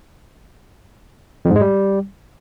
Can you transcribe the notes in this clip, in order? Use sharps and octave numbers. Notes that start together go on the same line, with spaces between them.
F2
G#2
G#3
G3